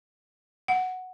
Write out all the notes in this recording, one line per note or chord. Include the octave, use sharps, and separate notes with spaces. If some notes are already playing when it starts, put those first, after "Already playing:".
F#5